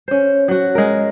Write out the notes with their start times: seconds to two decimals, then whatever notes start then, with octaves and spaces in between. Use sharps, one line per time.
0.08 C#4 C5
0.48 F#3 F#4
0.75 G#3 A#4